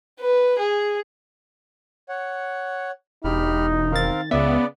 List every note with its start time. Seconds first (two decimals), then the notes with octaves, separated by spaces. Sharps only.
0.20 B4
0.58 G#4
2.09 C#5 F#5
3.24 E1 D#4 G4 B5 F6
3.92 D#3 C4 A#4 F5 A6
4.31 C#2 C#3 B3 D5 E5